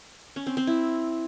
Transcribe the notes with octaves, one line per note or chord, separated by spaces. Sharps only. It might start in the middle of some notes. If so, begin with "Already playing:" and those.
C#4
C4
C4
E4